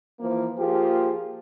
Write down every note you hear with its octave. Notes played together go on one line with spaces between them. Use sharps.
E3 F3 A#3
F3 A#3 F4 G4 G#4